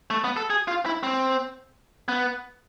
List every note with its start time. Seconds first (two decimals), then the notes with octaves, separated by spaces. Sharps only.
0.10 A3
0.24 B3
0.37 A4
0.50 G#4
0.68 F4
0.86 E4
1.03 C4
2.08 B3